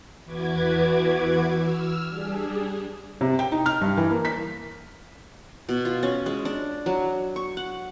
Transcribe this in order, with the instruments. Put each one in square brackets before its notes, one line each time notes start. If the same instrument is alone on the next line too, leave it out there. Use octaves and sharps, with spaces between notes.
[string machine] E2 E3 F#4 B4 D6 G#6
E6 F6
G3 D4 G#4
[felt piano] C3
G5
D#4
F6
G2
E3
A#3
B6
[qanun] B2
F4
C#4
G#3
D4
F#3
C#6
F#5